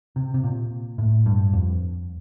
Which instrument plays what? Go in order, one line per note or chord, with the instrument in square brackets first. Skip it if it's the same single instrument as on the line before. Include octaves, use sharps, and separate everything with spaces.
[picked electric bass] C3
C3
A#2
A2
G2
F2